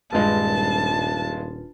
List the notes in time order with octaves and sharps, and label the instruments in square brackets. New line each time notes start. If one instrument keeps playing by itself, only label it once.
[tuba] D#1 [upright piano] G2 G#3 [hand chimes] D4 F4 B4 [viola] A5